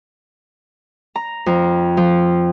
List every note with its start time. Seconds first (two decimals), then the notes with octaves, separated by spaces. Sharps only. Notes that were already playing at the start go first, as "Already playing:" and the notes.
1.16 A#5
1.46 F2
1.97 F3